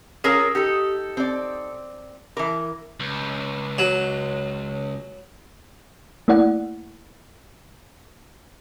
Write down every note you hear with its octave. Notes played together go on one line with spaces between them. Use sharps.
C#4 F4 G#4 A#4 E6
D#4 G4 A4
C4 D5
E3 A#4 D6
C#2
F#3
A3 A#3 E4 D5 F#5